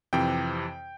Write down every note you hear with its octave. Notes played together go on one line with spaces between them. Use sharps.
F2 C3 E3 G5